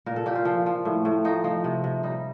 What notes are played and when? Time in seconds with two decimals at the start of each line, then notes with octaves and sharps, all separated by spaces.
0.06 A#2 A#4
0.16 A4
0.26 A#2 G4
0.35 F4
0.45 F3
0.66 F3
0.85 A2
1.05 A2
1.25 F3 D#4
1.44 F3 D#4
1.64 C3
1.84 C3
2.03 G3 D#4